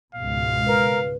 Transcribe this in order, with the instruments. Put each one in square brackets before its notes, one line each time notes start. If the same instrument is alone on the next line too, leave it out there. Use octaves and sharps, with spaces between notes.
[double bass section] C#2 G#2 B2 [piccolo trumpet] F5
[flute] A#4 [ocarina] B4